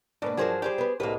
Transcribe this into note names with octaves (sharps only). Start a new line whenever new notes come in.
G#2 B2 A#3 D4 B4
G2 F3 F#3 G#4 A#4 C5
G3 G4 G#4 C5
B3 B4
C2 A2 G3 G#3 A#3 B4